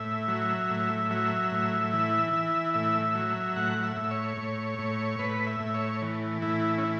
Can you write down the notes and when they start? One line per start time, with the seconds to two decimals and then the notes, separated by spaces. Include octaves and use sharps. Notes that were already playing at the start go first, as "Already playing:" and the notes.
Already playing: A2 E5
0.28 F#3
0.70 A2
1.11 F#3 E5
1.52 A2
1.93 E3
2.33 E3
2.74 A2 E5
3.15 F#3
3.56 A2 F#5
3.83 E5
3.96 A2
4.11 C#5
4.37 A2
4.79 A2
5.19 A2 B4
5.47 E5
5.60 A2
5.74 C#5
6.02 E3
6.42 A2 E4
6.78 C#4
6.83 E4